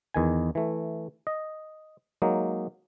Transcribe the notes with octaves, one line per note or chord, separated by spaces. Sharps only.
E2 D#3 G#5
E3 A3
D#5
F#3 G#3 A#3 D#4